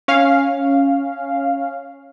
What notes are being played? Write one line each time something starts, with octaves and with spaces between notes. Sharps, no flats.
C#4 F5